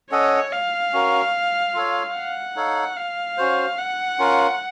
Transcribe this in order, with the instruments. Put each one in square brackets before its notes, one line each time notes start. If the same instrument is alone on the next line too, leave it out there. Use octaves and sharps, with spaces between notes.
[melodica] C#4 A4 D#5 F#5 [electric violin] C#5
[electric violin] F5
[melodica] C#4 F#4 A#4
F4 A4 C#5
[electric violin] F#5
[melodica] D#4 A4 C#5 F5
[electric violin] F5
[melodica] C#4 F#4 C5
[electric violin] F#5
[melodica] C#4 F4 A#4 F5